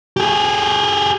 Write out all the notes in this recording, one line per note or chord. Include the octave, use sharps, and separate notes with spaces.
G4 G#4